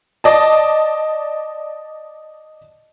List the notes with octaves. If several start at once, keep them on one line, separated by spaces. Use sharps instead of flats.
D5 D#5 A5